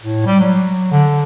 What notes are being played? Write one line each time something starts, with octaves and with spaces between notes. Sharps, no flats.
A2
G3
F#3
D3